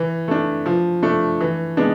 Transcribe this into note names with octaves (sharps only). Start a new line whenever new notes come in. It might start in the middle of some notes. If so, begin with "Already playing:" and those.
Already playing: E3
A3 D4
F3
A3 D4
E3
G#3 B3 D4